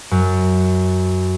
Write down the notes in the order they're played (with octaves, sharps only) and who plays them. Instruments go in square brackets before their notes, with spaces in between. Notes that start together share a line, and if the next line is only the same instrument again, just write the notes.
[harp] F#2